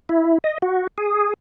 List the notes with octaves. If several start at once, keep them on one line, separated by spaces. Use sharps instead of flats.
E4
D#5
F#4
G#4